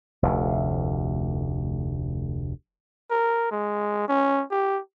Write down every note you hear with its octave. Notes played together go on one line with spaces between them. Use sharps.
F1 D2
A#4
G#3
C#4
G4